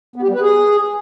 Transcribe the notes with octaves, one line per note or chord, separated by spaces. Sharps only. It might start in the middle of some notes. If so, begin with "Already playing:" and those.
B3
G4
G3
B4
G#4